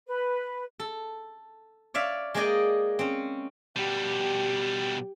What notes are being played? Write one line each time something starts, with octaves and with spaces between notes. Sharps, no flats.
B4
A4
C#5 D5 E5 F5
G#3 A#3 G#4 D5 D#5 G5
C4 C#4
B2 G3 G4